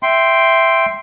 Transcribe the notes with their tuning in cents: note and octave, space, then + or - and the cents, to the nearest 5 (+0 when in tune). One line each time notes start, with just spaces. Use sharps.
E5 +0 G5 +0 C6 +0